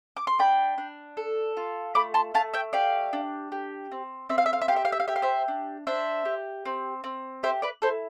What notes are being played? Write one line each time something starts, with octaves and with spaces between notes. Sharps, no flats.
D6
C6
D4 G5 B5
D4
A4
F4
A3 B5 D6
A5 C6
A3 F5 A5
E5 G5
G4 D5 F5
D4
G4
C4
C4 E5
F5
E5
F5
E5
G4 F5
E5
F5
E5
F5
G4 E5
F5
C5 E5
D4
D4 C5 E5
G4
C4
C4
G4 C5 E5
B4 D5
E4 A4 C5